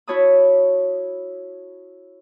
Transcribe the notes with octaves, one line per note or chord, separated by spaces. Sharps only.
E4 F#4 C#5 A5 B5 D#6